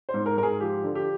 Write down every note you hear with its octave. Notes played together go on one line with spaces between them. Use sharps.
C5
G#2
A#4
G#2 A#4
G#4
F3 G4
D3
G4